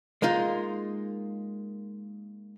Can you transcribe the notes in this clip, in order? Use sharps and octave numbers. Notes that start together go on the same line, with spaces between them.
G#3 A#3 D#4 F4